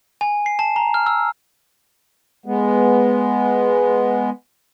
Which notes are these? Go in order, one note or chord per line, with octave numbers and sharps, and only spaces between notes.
G#5
C7
A5
A#5
F6
E6
G#3 B3